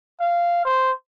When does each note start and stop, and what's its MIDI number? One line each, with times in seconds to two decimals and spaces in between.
0.20 0.60 77
0.65 0.91 72